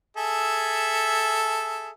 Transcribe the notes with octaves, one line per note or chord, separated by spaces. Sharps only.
G#4 A4 E5